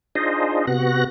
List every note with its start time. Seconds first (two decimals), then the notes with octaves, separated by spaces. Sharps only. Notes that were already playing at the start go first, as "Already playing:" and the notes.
0.15 D4 D#4 F4 G#4 C5 D#5
0.67 C3 B3 F#4 F#6 A#6